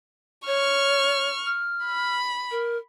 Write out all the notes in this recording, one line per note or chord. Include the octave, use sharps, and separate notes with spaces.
C#5 C#6 F6
F6
B5
A#4